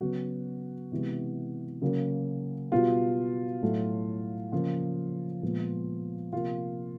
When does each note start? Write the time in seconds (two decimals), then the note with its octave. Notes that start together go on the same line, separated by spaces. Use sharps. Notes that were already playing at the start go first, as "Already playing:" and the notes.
0.01 C#3 F#3 B3 F#4
0.92 C3 E3 G#3 B3
1.82 C#3 F#3 A#3
2.72 B2 G3 B3 F4
3.63 A2 F#3 A3
4.52 C#3 F3 A#3 F4
5.43 A#2 F3 G#3 B3
6.32 C3 F3 A#3 F4